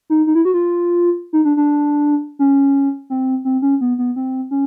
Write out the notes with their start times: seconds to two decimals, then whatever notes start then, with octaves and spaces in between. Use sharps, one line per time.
0.10 D#4
0.27 D#4
0.35 E4
0.45 F#4
0.54 F4
1.33 D#4
1.45 D4
1.57 D4
2.39 C#4
3.10 C4
3.45 C4
3.62 C#4
3.81 B3
3.98 B3
4.16 C4
4.51 C#4